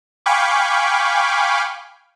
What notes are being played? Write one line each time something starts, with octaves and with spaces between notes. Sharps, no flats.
F5 G5 G#5 B5 C#6 D6